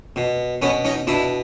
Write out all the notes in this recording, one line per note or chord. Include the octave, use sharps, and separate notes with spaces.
B2
B2 B3 C#4
C#4 D#4
B2 D4 E4